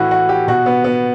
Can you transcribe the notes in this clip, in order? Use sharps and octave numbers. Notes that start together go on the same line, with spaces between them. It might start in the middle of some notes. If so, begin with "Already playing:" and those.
Already playing: A2 E3 F#4
F#4
G4
B2 F#4
B3
B3